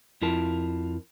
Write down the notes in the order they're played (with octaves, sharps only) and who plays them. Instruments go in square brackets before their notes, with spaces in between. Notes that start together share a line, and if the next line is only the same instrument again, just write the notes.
[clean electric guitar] F2 F3 E4 F4 A#4 A5